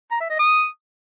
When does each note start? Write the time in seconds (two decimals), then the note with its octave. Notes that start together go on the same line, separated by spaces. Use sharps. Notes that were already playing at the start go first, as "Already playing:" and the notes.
0.11 A#5
0.20 E5
0.30 D#5
0.39 D#6